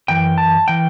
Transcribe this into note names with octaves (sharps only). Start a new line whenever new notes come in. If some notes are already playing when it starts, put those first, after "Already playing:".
F#2 E3 G5
A5
E3 G5